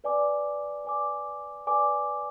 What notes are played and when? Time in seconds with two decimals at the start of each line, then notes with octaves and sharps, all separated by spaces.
0.04 B4 D5 G#5 D6
0.85 B4 D5 G#5 D6
1.67 B4 D5 G#5 D6